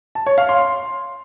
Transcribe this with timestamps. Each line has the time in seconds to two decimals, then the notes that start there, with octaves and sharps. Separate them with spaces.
0.15 A5
0.26 C#5
0.38 F5
0.49 C6